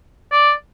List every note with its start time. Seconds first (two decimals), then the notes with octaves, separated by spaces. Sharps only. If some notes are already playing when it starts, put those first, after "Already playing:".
0.32 D5